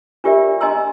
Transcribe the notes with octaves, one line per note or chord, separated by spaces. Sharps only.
D4 F4 G4 A#4 D5 E5
D4 D#5 G#5 A#5 C6 E6